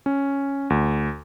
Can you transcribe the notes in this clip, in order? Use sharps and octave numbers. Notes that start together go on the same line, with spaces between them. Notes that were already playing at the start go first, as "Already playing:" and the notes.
C#4
D2